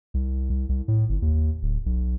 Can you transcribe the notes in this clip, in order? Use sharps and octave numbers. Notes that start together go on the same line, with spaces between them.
C2
C2
C2
A2
G1
D#2
D1
B1